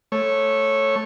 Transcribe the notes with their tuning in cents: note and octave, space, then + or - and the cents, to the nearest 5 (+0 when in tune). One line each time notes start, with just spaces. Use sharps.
A3 +0 C#5 -15